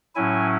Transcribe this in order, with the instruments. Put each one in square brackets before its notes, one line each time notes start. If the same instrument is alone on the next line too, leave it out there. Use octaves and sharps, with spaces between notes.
[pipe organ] A2 F#3 C#4 E4 G#5